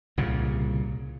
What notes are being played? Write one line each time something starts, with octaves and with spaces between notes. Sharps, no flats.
C2 A#2 C#3